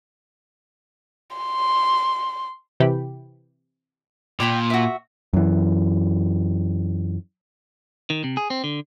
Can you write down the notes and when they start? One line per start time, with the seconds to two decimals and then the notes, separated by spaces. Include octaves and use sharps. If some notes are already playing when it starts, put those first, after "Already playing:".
1.37 C6
2.80 C3 E3 G4 G5 B5
4.40 A#2 D5 G5 B5
4.70 F#4 E5
5.33 F#2 E3
8.10 D#3
8.24 C3
8.37 G#4
8.50 C4
8.64 D3